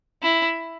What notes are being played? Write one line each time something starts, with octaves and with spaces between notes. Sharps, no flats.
E4